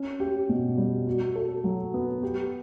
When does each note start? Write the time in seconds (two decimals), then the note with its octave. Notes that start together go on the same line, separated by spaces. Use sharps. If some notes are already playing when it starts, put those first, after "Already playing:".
Already playing: C#4
0.20 G4
0.49 B2
0.77 G3
1.07 F#4
1.36 A4
1.64 F#3
1.94 B3
2.23 G4